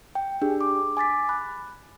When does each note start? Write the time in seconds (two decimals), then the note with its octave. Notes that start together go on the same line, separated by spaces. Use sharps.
0.15 G5
0.42 D4 G4 G#4
0.61 D6
0.97 G#5 D6 A6 B6
1.29 B5 F#6